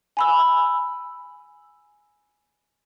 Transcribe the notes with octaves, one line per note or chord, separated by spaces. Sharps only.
G#5 B5 E6